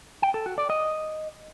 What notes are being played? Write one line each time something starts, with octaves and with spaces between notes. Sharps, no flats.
G5
A4
F#4
D5
D#5